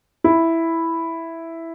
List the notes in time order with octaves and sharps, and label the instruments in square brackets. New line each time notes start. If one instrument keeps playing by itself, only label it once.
[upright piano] E4